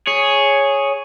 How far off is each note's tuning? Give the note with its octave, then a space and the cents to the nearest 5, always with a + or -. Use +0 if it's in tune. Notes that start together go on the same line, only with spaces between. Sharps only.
G#4 +0 C#5 +0